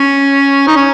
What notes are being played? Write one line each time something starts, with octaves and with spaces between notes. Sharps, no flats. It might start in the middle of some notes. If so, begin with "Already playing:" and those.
Already playing: C#4
D#4
C#4